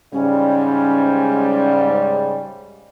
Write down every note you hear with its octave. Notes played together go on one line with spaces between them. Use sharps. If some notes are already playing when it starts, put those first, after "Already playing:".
G#2 C#3 G3 C#4